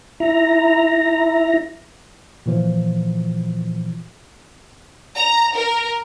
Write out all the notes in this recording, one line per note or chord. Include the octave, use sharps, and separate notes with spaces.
E4 A#5
A#2 E3 F3
A#5
A#4